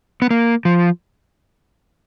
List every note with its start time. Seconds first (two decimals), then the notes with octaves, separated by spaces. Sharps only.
0.22 B3
0.31 A#3
0.65 F3